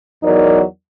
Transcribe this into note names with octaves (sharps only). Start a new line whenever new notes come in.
E2 F#3 D#4 A#4 D5